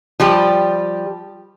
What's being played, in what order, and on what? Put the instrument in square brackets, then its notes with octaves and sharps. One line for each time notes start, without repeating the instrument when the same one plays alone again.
[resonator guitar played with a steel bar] F3 G3 G4